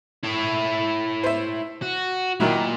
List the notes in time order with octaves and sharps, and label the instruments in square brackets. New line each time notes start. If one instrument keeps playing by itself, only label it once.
[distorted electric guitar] E4 C#5
[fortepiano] C5 E5
[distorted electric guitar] F#4
[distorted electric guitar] A#2 [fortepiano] D#3 F#3 E4